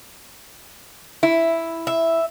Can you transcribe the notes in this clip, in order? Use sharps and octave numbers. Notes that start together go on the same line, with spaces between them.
E4
E5